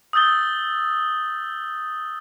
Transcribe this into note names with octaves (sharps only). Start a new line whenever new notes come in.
D#6 E6 G6 A6 G7